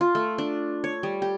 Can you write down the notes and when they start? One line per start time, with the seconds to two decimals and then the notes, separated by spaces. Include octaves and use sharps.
0.01 F4
0.15 A3
0.38 D4
0.84 C#5
1.03 G3
1.22 G4